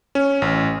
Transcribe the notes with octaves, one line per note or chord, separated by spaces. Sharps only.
C#4
A1